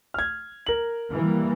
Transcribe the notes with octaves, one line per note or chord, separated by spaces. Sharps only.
F6 G#6
A#4 F#7
E3 G3 A#3